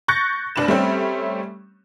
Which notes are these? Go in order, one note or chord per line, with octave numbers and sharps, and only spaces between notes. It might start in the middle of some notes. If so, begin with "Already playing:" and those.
C#6 F#6 G6 A6 A#6 C#7
F1 D4 B4 E7
G3 A3 C4 C#4